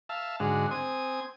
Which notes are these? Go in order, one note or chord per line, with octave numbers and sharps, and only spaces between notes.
E5 F5 A5
G#2 D3 G#3 F#4
C4 G#5 D#6